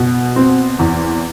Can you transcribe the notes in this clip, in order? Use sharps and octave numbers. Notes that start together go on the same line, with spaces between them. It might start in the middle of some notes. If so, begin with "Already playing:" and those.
Already playing: B2
C4
E2